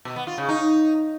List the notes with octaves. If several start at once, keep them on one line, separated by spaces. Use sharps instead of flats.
B2
B3
F4
C#3
D#4